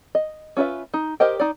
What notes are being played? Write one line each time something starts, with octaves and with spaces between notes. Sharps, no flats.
D#5
C#4 F4 A4 B4 E5
D#4
G4 A#4 C5 D#5 G5
D#4 D5